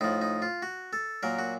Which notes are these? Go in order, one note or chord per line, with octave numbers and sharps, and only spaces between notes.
A2 F3 D#4
D#4
F4
F#4
A4
A#2 F#3 A#4
F#4